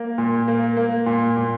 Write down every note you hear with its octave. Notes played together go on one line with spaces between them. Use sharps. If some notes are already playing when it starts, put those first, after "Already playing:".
Already playing: A#3
A#2
A#3
A#3
A#2
A#2